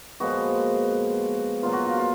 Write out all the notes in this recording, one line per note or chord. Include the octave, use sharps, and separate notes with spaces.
A#2 F3 G#3 B3 F#4
A#2 F#3 B3 F4
F#4
F4
F4